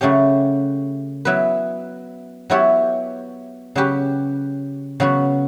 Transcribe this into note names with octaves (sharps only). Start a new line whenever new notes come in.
C#3 F#3 A3 C#4 G4
F#3 B3 E4 B4
F#3 B3 E4 G4 C#5
C#3 F#3 C#4 G4 B4
C#3 F#3 B3 F#4